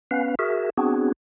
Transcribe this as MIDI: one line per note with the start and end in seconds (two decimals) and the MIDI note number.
0.11 0.35 59
0.11 0.35 61
0.11 0.35 71
0.11 0.35 77
0.39 0.70 66
0.39 0.70 68
0.39 0.70 70
0.39 0.70 76
0.77 1.12 59
0.77 1.12 60
0.77 1.12 62
0.77 1.12 66
0.77 1.12 68